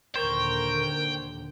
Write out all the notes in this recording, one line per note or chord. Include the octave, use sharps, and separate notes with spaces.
D#2 A#2 D3 A#4 C5 C#5 G5